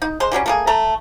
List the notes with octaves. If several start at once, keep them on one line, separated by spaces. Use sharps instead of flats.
D#4
G#3 C5 C6
E3 F#3 G3 C#4
A3 A#3 G#4
A3 A4 A#5